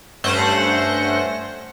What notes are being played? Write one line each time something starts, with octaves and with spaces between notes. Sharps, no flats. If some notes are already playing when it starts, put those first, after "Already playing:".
G2 A3 C#4 C5 F#5 A#6